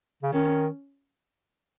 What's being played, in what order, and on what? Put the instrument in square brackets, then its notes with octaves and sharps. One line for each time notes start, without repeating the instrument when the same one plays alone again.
[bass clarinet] C#3
[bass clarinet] D#3 [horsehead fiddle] C#4